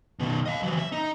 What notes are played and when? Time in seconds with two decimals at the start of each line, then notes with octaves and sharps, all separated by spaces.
0.19 B2 D#3
0.46 D#5 F5
0.63 E3 F#3
0.79 E5
0.92 D#4